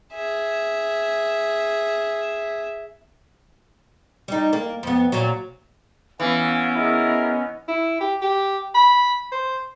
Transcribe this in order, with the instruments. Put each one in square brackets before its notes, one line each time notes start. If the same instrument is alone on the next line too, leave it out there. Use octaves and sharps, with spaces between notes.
[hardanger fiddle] G#4 E5
[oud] G3 D#4
A#3
F2 B3
A#2 F#3
[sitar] E3 [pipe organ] B3 C#4 [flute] F5
[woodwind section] E4 G#4 A#4 [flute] D#5
[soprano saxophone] E4
G4
G4
B5
C5